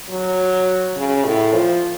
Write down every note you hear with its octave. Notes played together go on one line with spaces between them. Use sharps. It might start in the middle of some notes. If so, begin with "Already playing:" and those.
F#3
C#3
A2
F3